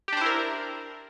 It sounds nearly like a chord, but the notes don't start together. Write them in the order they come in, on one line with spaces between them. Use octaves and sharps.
G4 D4 C5 E4 A#4